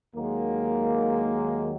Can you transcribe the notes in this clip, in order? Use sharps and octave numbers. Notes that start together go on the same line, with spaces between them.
D#2 D#3 F#3 G#3 A#3